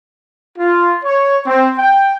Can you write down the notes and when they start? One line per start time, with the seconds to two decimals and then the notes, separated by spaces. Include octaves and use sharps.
0.58 F4
1.03 C#5
1.46 C4
1.78 G5